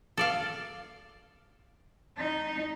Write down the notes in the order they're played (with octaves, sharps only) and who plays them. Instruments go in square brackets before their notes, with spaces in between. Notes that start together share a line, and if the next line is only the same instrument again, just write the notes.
[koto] A4 D5 F5
[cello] D#4